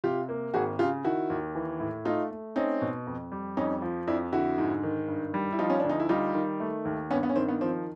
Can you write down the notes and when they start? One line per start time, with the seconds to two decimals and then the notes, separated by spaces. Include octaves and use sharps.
0.04 C3 F4 G4
0.29 A#3
0.54 G#1 F#4 G#4
0.79 C#3 F4 G4
1.05 D#3 E4 F#4
1.30 D#2
1.55 E3
1.80 A2
2.05 A3 D#4 F4
2.31 A3
2.56 C4 C#4 D#4
2.82 B2
3.07 F2
3.32 G3
3.57 F2 C#4 D#4
3.82 F3
4.07 F2 D4 E4
4.33 D3 E4 F#4
4.58 G#2
4.83 D#3
5.08 G2
5.34 G3
5.52 E4
5.59 F3 D#4 F4
5.70 C#4
5.80 D2 D4
5.89 D#4
6.00 E4
6.09 G3 D#4 F4
6.35 D#3
6.60 A3
6.85 D#2
7.11 G2 B3 C#4
7.23 B3
7.29 C#4
7.36 D#3 C4
7.48 B3
7.61 F3 C4